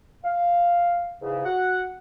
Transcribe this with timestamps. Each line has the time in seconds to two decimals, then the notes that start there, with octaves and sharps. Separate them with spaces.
0.24 F5
1.21 E2 G#2 C#3
1.45 F#4 F#5